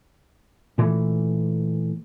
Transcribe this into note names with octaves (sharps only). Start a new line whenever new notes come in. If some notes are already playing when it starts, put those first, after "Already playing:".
A#2 E3 A3